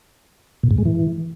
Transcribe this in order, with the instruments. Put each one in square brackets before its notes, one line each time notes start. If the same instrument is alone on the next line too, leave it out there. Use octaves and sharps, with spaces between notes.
[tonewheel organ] A#2
G#2
G#3
E3